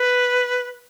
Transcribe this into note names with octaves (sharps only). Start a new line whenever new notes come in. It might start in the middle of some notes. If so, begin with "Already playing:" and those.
Already playing: B4